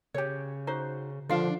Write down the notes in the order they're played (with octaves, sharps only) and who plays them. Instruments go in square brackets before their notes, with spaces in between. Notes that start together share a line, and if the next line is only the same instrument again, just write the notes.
[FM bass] C#3 [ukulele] G4 C#5
[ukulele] D#4 F#4 C5
[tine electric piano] D3 F3 [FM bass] D4 [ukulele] F4 F5